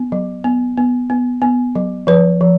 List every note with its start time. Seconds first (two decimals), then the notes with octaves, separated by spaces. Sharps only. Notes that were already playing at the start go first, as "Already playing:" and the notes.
Already playing: B3
0.12 F#3
0.44 B3
0.77 B3
1.10 B3
1.42 B3
1.75 F#3
2.07 F3 B4
2.41 F3